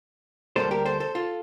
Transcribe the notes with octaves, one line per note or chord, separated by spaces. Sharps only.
D2 D3 G3 A#3 A4 C5
G4 A#4
A4 C5
A4 C5
F4 A4